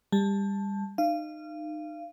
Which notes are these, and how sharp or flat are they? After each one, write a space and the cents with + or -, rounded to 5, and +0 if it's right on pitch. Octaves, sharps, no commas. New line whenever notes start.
G3 +25 A5 +0
D#4 -30 F5 -25